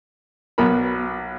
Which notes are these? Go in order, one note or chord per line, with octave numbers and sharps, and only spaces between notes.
B1 B3 F#4 A#4 B5